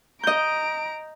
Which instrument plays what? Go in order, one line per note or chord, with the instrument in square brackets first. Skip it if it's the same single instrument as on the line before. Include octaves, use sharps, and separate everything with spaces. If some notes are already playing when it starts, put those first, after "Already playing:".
[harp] D#5 G6 [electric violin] A#5 D7